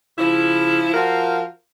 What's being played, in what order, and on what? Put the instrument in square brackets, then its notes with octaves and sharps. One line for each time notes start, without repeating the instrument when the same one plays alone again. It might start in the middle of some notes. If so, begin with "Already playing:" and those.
[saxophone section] C#3 F3 E4
F3 F4 F#4 A#4